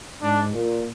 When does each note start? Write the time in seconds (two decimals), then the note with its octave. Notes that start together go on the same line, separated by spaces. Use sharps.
0.22 G#2 D4
0.52 A#2